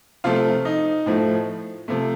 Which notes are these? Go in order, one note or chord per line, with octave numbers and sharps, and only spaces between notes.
C3 F3 A3 F4 F5
D#4 D#5
A2 F3 A3
C3 F3 A3